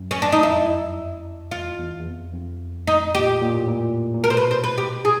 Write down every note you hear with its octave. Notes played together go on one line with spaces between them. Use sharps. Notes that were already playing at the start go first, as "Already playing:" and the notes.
Already playing: F#2
C#4
D4
D#4
F2 E4
E2 F4
E2
E2
F2
F2
D#4
A#2 G4
A#2
A2
A#2
A#2
B2 A#4
C5
B4
C5
B4
G4
G#4